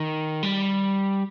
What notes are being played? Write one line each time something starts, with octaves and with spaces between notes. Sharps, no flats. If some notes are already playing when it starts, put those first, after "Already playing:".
Already playing: D#3
G3